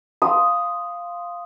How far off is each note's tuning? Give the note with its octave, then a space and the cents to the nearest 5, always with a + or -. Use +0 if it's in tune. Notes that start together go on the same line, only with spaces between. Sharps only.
F5 +0 C6 +0 D#6 +0